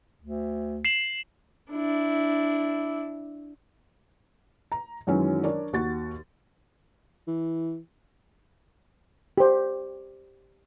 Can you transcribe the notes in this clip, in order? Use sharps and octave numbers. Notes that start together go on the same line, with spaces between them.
D2
C7 E7 F#7
D4 E4
A#5
F#2 D#3 E3 F#3 G#3 C#4
D4 A#4 C#5 D5
D#2 F#4 A6
E3
G4 C5